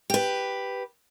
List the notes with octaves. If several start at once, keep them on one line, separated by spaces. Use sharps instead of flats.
G4 B4